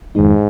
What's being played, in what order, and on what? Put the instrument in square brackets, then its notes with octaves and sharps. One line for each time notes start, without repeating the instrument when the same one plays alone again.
[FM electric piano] F2 D#3 G#3 D#4 [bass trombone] G#2